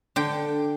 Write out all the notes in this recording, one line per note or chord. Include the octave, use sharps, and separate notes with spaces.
D3 G5